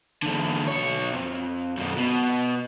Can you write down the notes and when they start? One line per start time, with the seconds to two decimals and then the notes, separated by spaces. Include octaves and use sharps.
0.23 E2 D3
0.68 B1 C#5
1.14 F2
1.77 F#2 B2
1.98 B2